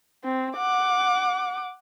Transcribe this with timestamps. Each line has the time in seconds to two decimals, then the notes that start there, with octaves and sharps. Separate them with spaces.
0.24 C4
0.57 F#5 D6